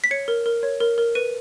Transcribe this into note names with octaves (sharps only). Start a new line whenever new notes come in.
B6
C#5 C#7
A#4
A#4
C#5
A#4
A#4
B4 D#7